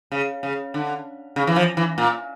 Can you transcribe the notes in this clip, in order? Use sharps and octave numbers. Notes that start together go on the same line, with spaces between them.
C#3
C#3
D3
C#3
E3
F3
E3
A#2